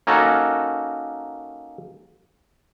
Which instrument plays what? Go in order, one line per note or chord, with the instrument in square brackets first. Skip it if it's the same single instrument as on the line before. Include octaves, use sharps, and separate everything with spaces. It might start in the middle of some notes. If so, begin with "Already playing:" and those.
[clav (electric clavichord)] A#3 C#4 D#4 F#4 A4 A#4